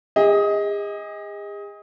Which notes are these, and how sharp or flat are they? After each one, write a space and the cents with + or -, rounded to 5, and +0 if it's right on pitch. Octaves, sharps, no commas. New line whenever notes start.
G#4 -40 D#5 +20